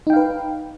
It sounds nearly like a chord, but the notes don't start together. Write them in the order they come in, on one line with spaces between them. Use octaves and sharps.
D#4 G5 F5 B4